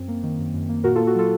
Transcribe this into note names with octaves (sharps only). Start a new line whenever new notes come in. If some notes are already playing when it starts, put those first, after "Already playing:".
Already playing: F#2 C4
A#3
D#3
F#2
F#2
A#3
A#2 F#4 A#4
F4 A4
A#3
F#4
F#3 F4 A4